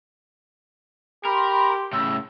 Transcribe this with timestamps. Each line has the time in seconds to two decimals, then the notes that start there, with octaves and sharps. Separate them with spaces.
1.25 G4 A#4 B5 C6
1.93 A2 C#3 E6